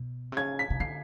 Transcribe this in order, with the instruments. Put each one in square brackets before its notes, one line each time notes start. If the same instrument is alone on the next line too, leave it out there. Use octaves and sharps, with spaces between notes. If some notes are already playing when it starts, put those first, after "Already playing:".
Already playing: [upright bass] B2
C3
[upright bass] C#3 [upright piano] G#6
[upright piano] B6
[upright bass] C#3
[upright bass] D3 [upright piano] C7